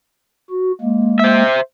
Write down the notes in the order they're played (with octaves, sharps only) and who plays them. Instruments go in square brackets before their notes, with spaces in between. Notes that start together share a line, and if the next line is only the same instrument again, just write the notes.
[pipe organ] F#4
G#3 A#3
[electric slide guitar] C5 E5